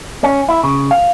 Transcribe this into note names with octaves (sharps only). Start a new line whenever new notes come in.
C#4
E4
C#3
F5